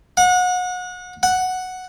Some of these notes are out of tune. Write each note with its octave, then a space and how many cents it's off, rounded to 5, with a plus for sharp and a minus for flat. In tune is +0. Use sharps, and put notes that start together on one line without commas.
F#5 -30
F#5 +0